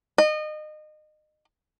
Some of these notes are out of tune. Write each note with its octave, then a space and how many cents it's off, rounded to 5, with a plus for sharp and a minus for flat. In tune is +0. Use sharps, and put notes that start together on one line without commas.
D#5 -30